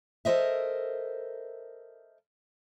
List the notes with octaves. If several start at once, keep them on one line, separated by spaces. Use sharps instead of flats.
A4 A#4 C5 D#5 E5